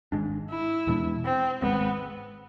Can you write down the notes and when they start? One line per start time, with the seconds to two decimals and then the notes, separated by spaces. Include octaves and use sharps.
0.12 G#1 G#2 G#3 D4
0.50 E4
0.87 E2 B2 G#3 D4
1.25 C4
1.62 G#1 G#2 G#3 B3 C4